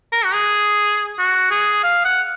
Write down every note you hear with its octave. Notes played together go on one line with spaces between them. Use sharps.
A#4
F#4
G#4
F#4
G#4
F5
F#5